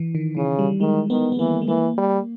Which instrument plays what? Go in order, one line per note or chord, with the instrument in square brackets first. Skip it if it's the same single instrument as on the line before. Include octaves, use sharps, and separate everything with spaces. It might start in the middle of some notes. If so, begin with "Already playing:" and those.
Already playing: [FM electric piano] E3
D#3
[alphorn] C#3 [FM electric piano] E3
[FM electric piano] G3
[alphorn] D#3 [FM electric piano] G#3
[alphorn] D#3 [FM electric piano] B3
[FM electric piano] B3
[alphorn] E3 [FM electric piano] A#3
[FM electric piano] G#3
[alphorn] E3 [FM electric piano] A#3
[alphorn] G3